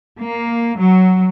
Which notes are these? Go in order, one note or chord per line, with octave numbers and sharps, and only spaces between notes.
A#3
F#3